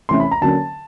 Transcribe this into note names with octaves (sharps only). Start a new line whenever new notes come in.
C3 E3 A3 C#4 C6
B5
A#5
D3 F#3 A#3 C#4 A5